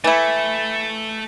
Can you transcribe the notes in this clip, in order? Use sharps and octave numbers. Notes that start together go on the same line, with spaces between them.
E3 A3 E4